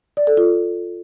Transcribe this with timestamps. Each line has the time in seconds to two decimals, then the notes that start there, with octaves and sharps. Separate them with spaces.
0.17 D5
0.27 A4
0.37 F4